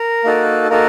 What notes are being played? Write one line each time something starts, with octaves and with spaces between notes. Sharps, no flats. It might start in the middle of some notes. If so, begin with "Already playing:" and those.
Already playing: A#4
A#3 D#4 F#4 A4
A#3 D#4 F#4 A4 A#4